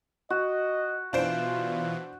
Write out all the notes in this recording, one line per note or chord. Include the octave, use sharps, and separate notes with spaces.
F#4 D#5
B2 E3 D4 F4 C5 D7